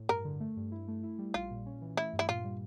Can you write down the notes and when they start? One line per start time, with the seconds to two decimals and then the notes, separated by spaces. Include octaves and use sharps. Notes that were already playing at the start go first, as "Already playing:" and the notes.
Already playing: A2
0.09 G2 A#4
0.24 D3
0.40 A3
0.57 G2
0.72 E4
0.88 A3
1.03 E4
1.18 G3
1.34 A#1 F4
1.51 A#2
1.66 C#4
1.81 E3
1.97 A3 E4
2.13 G2
2.19 E4
2.29 A#2 F4
2.44 G3